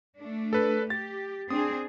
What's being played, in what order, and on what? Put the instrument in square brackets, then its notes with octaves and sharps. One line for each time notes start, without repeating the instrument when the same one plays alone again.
[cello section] A3 D4
[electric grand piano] A4 B4
[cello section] G4 [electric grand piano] A6
[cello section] C4 D4 G#4 [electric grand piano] D#6